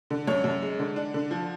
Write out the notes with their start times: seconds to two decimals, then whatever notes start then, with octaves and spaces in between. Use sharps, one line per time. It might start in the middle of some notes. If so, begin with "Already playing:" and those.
0.10 D3
0.27 F#2 C#5
0.44 F#2
0.62 G#3
0.79 D3
0.96 D4
1.14 D3
1.31 F3